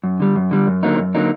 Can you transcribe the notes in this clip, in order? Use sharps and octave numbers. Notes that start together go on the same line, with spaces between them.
F#2
D3 G3
F#2
D3 G3
F#2
D3 F#3 A#3 D#4
F#2
D3 F#3 A#3 D#4